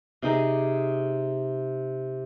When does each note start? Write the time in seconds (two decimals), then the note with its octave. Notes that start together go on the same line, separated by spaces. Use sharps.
0.22 C3 D#4 G#4 D6